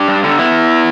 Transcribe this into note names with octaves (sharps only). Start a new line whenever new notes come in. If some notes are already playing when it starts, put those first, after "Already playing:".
Already playing: D4 G4
G2
D3
B3 E4